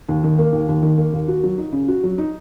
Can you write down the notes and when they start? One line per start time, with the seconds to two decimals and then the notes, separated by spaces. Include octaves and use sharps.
0.09 D#2
0.24 D#3
0.38 A#3
0.52 D#2
0.69 D#2
0.82 D#3
0.98 A#3
1.13 D#2
1.28 F#4
1.44 F#3
1.58 D#4
1.73 C#3
1.88 F#4
2.04 F#3
2.18 D#4